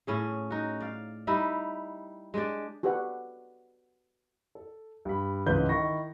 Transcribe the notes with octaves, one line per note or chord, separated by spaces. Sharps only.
A2 C#4 G#4
D#4 F#4
D5 F5
G3 D#4 E4 G4
G#3 D4 G4 D5
F#4 G4 A4 B4 D5 F#5
A4
G2 B5
C#2 G#2 E3 B4 G6
D#3 E4 C#6 A#6